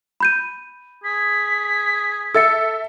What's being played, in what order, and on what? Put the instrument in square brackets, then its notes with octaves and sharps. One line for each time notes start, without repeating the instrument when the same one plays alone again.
[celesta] B5 G6 D#7
[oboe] G#4 [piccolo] B6
[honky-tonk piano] A4 E5 [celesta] E6 A6 C#7